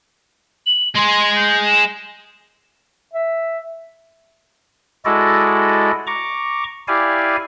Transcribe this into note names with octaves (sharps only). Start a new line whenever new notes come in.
F#7
G#3 G#4 C6
G6
E7
E5
G#3 E4 F#4 A4 D5 D#5
A#5 C#6 D6
E4 G4 D5 F5 G#5